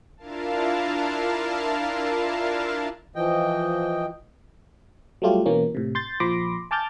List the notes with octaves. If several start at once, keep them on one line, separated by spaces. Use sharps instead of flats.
D4 E4 F4 A#4 F5 A5
E3 F3 D#5 G5
F#3 G3 A3 F4 G4
B2 E3 A#3 C#4
A2 C3
C6 G6 A6
A#2 F3 B5 C6 D6 A#6
G#5 A5 D6 F6 G6 A6